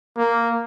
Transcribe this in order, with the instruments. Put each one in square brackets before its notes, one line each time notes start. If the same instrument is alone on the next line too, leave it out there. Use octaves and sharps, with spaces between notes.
[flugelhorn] A#3